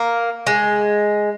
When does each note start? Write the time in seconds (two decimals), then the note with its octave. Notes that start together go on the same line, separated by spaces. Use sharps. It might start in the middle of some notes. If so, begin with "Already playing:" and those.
Already playing: A#3
0.47 G#3